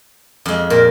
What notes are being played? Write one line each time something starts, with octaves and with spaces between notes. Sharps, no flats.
F2 G#3
A#2 A#4